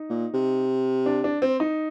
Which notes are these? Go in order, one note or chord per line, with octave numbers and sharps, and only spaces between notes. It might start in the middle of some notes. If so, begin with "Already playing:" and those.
Already playing: D#4
A#2
C3
D4
D4
C4
D#4